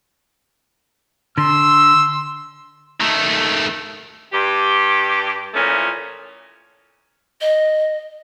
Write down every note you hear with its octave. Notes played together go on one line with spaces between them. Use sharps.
D3 C6 E6
D#3 A3
G2 G4
A#2 E3 F3 A3 C#4
D#5